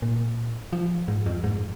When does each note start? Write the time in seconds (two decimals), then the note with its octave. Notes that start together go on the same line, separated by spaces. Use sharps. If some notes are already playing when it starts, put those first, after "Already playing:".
0.02 A#2
0.73 F3
1.08 G#2
1.26 F2
1.44 G#2